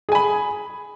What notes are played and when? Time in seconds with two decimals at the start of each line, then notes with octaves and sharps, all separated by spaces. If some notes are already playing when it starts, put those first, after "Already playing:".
0.09 G#4
0.12 G#5
0.15 B5